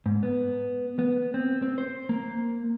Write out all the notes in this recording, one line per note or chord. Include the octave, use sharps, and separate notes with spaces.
G#2
B3
B3
C4
C4
C5
A#3